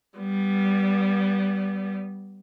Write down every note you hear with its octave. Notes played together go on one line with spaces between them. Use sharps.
G3 B3